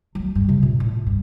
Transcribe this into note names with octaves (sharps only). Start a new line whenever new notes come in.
F#3 A3
G2 F#3
C3 F#3
A#2
A2
G2